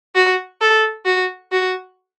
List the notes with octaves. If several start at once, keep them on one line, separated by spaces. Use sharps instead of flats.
F#4
A4
F#4
F#4